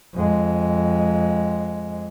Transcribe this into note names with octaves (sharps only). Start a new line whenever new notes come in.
F2 G#3